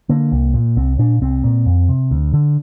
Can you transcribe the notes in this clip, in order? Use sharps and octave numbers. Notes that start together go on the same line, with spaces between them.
D3 A#3
C2
A#2
C2 C4
A#2 D4
C2 C4
A#2
F2
C3
D2
D3